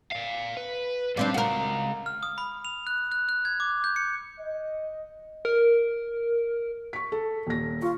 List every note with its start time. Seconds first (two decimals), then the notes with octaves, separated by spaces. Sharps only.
0.12 D5 F5
0.57 B4
1.17 C#2 G3 C4 D4 F5
1.34 F#4 A#4
2.06 F6
2.23 D#6
2.38 B5
2.65 F7
2.87 F#6
3.12 F#6
3.29 F#6
3.45 G#6
3.60 D6
3.84 G6
3.96 C#7
4.39 D#5
5.45 A#4
6.93 C#6 B6
7.12 A4
7.47 D#1 A#6
7.82 F4 C#6